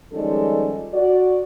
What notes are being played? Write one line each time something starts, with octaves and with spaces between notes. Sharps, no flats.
D#3 F3 G3 G#3 C#4 A4
F#4 D5